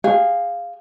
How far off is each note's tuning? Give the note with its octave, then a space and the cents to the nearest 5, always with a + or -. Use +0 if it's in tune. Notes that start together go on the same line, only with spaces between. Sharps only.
G#4 -25 F5 +0